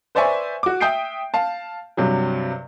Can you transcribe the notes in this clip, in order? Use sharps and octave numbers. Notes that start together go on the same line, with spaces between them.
B4 C5 D5 E5 G#5 C#6
F#4 D6
E5 G5 D#6 G6 C7 D7
F5 A5
G2 C3 F#3